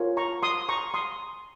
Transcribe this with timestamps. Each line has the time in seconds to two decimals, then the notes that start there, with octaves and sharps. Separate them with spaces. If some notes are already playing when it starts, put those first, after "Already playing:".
Already playing: F4 A#4 C#5
0.17 A#5 C#6
0.43 C6 D#6
0.69 A#5 C#6
0.94 C6 D#6